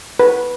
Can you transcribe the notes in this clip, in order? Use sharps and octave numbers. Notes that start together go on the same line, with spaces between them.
B4